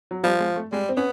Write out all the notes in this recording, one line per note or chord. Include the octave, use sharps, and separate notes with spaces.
F#3
F3 G3
G#3
A3
G3 G#3
C4
B3 C#4